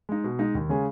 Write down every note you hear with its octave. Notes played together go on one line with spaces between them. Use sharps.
G#3 D#4
B2
G#3 D#4
D#2
C#3 G#3 C#4 G#4